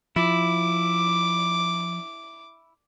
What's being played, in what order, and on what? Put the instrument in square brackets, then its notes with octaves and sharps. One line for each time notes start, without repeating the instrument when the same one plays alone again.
[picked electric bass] F3 [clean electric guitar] E4 [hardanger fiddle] D6